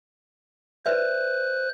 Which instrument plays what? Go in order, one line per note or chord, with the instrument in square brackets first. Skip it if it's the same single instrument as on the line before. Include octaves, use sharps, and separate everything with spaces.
[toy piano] B4 D5 E5 [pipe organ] C5 F#6